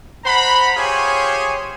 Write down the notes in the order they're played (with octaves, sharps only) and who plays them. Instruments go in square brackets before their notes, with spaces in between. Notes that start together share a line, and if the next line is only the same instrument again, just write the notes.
[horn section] C5 F#5 A#5 B5
F4 G4 G#4 C5 C#5 G#5